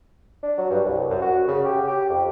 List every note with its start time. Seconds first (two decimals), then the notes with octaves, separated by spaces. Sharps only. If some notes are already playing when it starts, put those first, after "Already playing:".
0.43 D4
0.58 F#3
0.71 G2
0.85 C2
1.10 F#2
1.22 F#4
1.48 C#3
1.65 G4
1.88 G4
2.10 F2